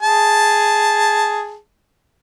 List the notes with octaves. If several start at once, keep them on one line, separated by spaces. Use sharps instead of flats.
G#4 A5